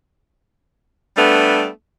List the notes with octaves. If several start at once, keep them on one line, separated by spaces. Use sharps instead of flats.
G3 A3 B3 D4